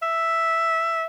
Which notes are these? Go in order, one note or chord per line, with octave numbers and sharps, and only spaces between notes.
E5